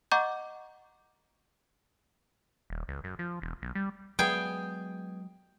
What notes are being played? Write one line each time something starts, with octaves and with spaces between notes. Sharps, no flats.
D#5 F#5 A#5 C#6 D6 G6
D#1
C#2
F#2
F3
E1
B1
G3
F#3 G#3 B3 G#4 G5